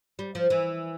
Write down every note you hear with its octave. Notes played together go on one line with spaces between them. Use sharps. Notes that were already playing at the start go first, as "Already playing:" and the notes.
G3
F3
E3